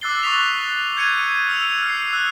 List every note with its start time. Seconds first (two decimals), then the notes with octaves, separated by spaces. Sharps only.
0.01 D6 E6 F#6 A6 C7 G7
0.23 C#6 D#6 B6 F7
0.97 G6 G#6 C#7 D#7
1.48 E6 F6 F7
1.83 F6 C7
2.13 E6 F#6